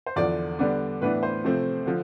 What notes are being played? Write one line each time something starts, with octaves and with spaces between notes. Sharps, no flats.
C5
E2 D3 F3 D5
D3 G3 B3 D4
A2 E3 B3 D4 B4
C5
C3 F3 A3 C4
D3 F3